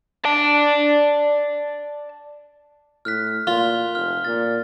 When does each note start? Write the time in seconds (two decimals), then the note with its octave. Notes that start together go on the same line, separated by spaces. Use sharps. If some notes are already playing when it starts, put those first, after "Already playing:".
0.25 D5 A5
3.05 A2 F6 F#6 B6
3.47 A#2 F4
3.95 F1 F6
4.24 A#2 A6